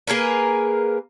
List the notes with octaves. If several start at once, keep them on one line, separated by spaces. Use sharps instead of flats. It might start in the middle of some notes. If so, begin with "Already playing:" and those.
A#3 G#4 A#4 B4